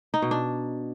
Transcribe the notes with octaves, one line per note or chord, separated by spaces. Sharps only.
D#4
B2
D4